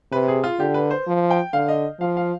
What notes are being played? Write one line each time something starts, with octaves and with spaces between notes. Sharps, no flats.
C3 B4
G#4
F4
D3 G4
B4
C5
F3
G5
D3 F5
D#5
F3 F5
F5